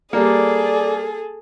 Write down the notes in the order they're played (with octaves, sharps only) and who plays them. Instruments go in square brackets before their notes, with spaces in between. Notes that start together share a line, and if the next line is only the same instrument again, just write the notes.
[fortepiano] G3 A#3 [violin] G#4 A4 [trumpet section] D5